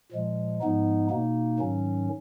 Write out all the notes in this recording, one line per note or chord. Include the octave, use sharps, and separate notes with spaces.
A#2 F3 G#3
G#2 F3 G#3 B3 D#4
B2 A#3 D#4
G#2 D#3 F#3 C#4